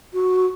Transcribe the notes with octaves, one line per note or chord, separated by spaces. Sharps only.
F#4